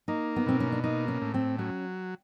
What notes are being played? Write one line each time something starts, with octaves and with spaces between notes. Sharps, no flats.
A#3 D#4
B3
B2 C4
C#4
D4
A#3 D#4
C#4
A2
C4
F#3 C#4